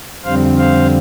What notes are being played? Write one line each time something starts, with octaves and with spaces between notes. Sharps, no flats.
F2 D3 G3 C4 C5 F5
C5 F5